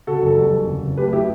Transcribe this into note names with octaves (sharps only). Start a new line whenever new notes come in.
C#3 F#4 A4
F#1
G3
E2
C#3
F#1
A3 G4 B4
E4 G4